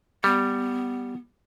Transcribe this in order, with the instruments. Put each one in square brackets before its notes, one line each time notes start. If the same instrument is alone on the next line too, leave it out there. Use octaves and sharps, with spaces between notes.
[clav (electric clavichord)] G3 [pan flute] B3